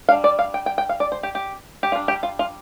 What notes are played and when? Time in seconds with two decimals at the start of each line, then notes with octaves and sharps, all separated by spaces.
0.09 G3 D4 F5
0.24 D5
0.39 F5
0.54 G5
0.66 G5
0.78 G5
0.89 F5
1.00 D5
1.12 C5
1.23 G4
1.35 G4
1.83 G4
1.92 G3 D4 F4
2.08 G4
2.23 F4
2.39 F4